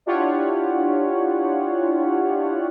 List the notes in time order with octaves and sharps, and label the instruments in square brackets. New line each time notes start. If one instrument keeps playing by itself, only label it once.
[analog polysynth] D4 E4 F4 G4 C#5 F#5